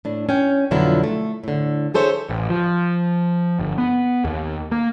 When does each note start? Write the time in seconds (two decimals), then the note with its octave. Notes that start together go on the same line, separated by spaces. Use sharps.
0.05 A2 D4
0.29 C#4 G5
0.71 F2 B2 D3 F#3 E4 F4
1.04 A3
1.44 A2 D3
1.94 G#4 A4 C5 C#5 E5
2.29 A1
2.50 F3
3.59 G1
3.78 B3
4.25 D#2
4.71 A#3